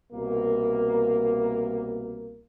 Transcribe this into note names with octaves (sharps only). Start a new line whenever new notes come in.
C2 B2 A#3